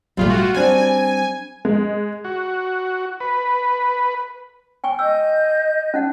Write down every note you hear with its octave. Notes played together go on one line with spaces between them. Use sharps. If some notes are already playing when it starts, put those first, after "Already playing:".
G#1 A#2 G3 A3 F4
F4 F#4
G3 C4 D4 G#5
G#3
F#4
B4
G5 G#5 C#6
D#5 E6 G6
C#4 D#4 F#5